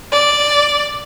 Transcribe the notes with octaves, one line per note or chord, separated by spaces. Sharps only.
D5